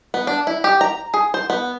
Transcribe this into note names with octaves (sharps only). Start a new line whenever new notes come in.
B3
D4
E4
G4
A#5
G#4
C5
B3